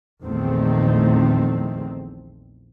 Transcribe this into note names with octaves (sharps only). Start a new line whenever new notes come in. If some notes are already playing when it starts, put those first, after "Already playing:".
A#1 E2 D#3 A3 C4